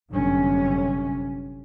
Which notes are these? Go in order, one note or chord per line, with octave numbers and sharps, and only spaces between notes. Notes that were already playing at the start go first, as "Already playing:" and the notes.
G1 F#2 C3 C#4